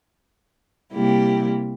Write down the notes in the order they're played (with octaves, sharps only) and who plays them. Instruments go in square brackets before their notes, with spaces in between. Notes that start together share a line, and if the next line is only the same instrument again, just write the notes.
[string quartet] C3 G3 A#3 E4 G4